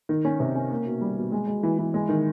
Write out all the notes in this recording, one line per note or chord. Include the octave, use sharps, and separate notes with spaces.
D#3
C#4
C3
C#4
A#3
B2
G3
B2
G#3
G#3
E3
E3
G#3
D#3